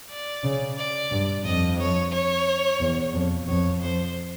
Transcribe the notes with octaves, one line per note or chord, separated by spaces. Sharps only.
D5
C#3
D5
G2
F2 D#5
C#5
C#5
E2
F2
F2 C#5
C5